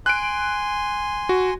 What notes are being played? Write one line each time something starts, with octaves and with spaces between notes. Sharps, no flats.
G#5 C6 F#6 D7
F#4